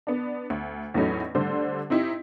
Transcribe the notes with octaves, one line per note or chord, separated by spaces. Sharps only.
B3 D4
D2
E2 A2 F#3 A3 C#4 D#4
D3 G3 A3 D4 C5
C4 D#4 E4 G4